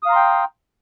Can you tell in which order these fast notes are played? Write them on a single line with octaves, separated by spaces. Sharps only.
D#6 F5 A#5 C6 G5